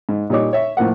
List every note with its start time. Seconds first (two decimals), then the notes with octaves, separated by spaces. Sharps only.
0.09 G#2
0.30 A#2 G3 D#4 C#5 D6
0.53 C#5 E5
0.77 A2 F3 A#3 F#5